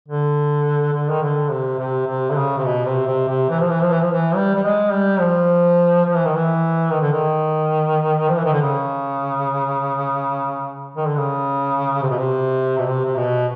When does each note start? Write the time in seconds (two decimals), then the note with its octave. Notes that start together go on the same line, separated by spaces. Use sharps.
0.08 D3
0.93 D3
1.10 D#3
1.22 D3
1.50 C3
1.79 C3
2.07 C3
2.30 D3
2.36 C#3
2.58 C3
2.64 B2
2.85 C3
3.07 C3
3.28 C3
3.49 E3
3.60 F3
3.70 E3
3.81 F3
3.91 E3
4.01 F3
4.12 E3
4.35 G3
4.56 G3
4.63 G#3
4.92 G3
5.20 F3
6.05 F3
6.15 E3
6.26 D#3
6.35 E3
6.91 D#3
7.01 D3
7.12 D#3
8.29 F3
8.37 E3
8.45 D#3
8.53 D3
8.61 C#3
10.96 D#3
11.07 D3
11.17 C#3
12.02 C3
12.10 B2
12.18 C3
12.78 B2
12.88 C3
13.05 C3
13.16 B2